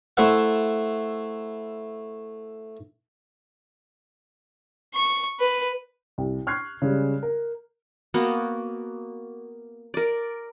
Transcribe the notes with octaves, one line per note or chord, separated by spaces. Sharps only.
A3 E4 C5 E5 F#5
C#6
B4
C2
C#6 F6 F#6 G#6 C7
C#3 G3 G#3
A#4
A#3 B3 F#4
A#4 D5